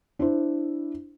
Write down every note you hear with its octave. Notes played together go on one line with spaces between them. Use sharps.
D4 E4 C5